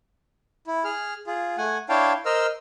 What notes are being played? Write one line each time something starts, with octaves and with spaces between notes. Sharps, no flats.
E4
G#4 F6
F4 G#4
A3 F#5 G#5
D4 E4 C#5 F5 G5 A5
A#4 C5 D#5 E6 F6